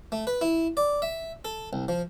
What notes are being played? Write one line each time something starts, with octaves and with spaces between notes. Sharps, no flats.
A3
B4
E4
D5
E5
A4
C2
F3